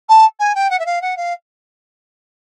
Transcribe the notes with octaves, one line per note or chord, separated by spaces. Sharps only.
A5
G#5
G5
F#5
E5
F5
F#5
F5